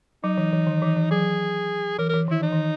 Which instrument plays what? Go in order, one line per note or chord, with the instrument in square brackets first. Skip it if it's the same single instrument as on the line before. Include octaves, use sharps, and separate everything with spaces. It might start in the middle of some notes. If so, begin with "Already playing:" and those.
[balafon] F#3 [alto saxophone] D#4
[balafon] E3
E3
D#3
E3
E3
[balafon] F#3 [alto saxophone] G#4
[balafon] E3 [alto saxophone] A#4
[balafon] E3 [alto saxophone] A#4
[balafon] D#3
[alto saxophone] E4
[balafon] E3 [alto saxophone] D#4
[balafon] D#3